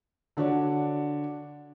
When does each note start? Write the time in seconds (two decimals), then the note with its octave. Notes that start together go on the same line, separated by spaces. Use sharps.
0.37 D3 D4 F#4 C#5 D5